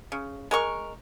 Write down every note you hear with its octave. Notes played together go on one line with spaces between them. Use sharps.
C#3
G#3 A#4 C#6